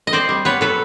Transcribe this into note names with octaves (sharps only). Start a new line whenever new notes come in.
D#5
C4 C5 D5
G3
B3 B4 C#5
F#3 A4 B4